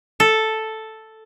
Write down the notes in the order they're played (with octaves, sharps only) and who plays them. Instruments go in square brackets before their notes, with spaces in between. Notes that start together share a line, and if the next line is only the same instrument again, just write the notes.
[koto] A4